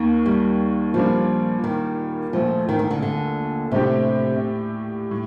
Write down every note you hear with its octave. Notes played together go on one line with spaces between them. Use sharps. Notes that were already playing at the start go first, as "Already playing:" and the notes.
Already playing: D#2 D#3 A#3
G3
A#2 F3 G3 A#3 D4
D#3
A#1 A#2 F3 A3
D#3
D#3
D3
D3
A2 C3 A3 D4 G4
A2